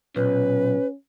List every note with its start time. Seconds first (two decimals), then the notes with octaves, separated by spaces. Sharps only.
0.16 B1 A#2 C#4 B4